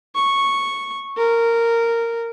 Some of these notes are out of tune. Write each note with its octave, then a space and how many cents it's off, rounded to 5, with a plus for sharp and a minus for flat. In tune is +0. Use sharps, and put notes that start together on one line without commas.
C#6 -5
A#4 -10